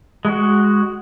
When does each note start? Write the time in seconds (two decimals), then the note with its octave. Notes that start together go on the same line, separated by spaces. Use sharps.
0.25 G#3 F#4